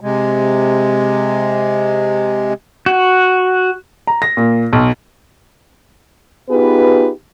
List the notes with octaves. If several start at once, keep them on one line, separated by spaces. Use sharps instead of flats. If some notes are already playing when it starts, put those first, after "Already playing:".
C3 G#3
F#4
A#5
A#6
A#2
B1
B3 D#4 F4 G4 G#4 B4